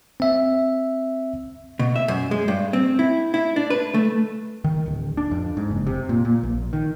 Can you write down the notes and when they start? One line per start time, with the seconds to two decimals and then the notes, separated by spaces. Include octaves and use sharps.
0.20 C4 E5
1.79 B2
1.96 E5
2.08 F#2
2.31 G#3
2.48 G2
2.73 C4
2.99 E4
3.34 E4
3.56 D4
3.70 B4
3.94 A3
4.64 D#3
4.86 D1
5.17 D4
5.32 F2
5.57 G#2
5.71 F#1
5.87 C3
6.09 A#2
6.25 A#2
6.43 A#1
6.73 D#3